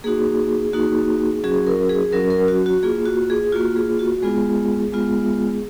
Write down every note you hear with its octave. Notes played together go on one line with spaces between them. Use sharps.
A#3 D#4 F#4 G#4
A#3 D#4 F#4
F#3 C#4 F#4 G#4
A#4
G#4
F#3 C#4 F#4 A#4
A#4
F#4
F#4
A#3 F4 G#4
F#4
G#4
A#3 F4 F#4
G#4
F#4
G#3 B3 F4 G#4
G#3 B3 F4